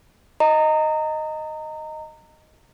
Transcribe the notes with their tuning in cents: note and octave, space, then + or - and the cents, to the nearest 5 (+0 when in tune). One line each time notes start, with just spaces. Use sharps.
D#5 +0 A#5 -25